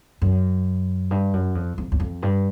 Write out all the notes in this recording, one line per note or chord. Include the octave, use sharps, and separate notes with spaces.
F#2
G2
F#2
F2
F2
E2
F2
G2